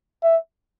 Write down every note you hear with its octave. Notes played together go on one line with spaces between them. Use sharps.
E5